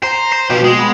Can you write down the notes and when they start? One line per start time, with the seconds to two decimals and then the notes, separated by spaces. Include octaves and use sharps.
0.03 C5 A#5
0.32 C5
0.50 B2 F3 G4
0.64 G#3
0.78 B3